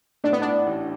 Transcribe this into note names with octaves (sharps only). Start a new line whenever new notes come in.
A2 D4
B3
A2 D4
A1